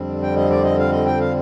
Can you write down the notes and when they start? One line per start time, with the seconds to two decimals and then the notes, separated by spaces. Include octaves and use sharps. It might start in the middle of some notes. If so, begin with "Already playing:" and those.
Already playing: F2 D3 G3 C4
0.22 G5
0.36 D#5
0.50 D5
0.64 D#5
0.78 F5
0.92 D#5
1.06 G5
1.20 F5